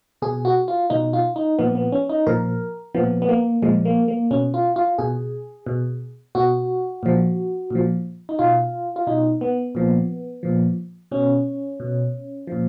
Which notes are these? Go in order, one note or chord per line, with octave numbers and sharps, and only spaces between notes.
B2 G#4
F#4
F4
B2 D#4
F4
D#4
A#2 F3 B3
B3
C#4
D#4
A#2 F3 A#4
A#2 F3 B3
B3
A#3
A#2 F3 G#3
A#3
A#3
B2 C#4
F4
F4
B2 G#4
B2
B2 F#4
A#2 F3
A#2 F3
D#4
B2 F4
F4
B2 D#4
B3
A#2 F3
A#2 F3
B2 C#4
B2
A#2 F3